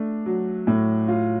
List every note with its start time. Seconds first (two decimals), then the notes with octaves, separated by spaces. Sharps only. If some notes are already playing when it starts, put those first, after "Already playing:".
Already playing: A3 D4
0.26 F#3
0.67 A2
1.08 F4